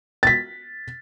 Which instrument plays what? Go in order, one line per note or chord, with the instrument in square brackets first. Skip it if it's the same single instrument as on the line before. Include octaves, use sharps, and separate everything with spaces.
[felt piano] A6 B6